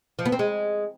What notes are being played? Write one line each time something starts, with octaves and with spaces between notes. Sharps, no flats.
F3
B3
C4
G#3